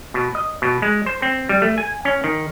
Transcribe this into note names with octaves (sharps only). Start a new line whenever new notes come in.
B2
D#5
B2
G#3
C5
C4
G3
A3
G#5
C#4
D#3